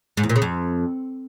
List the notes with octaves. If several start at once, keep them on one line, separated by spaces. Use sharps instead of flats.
G#2
E2
A#2
C#3
F2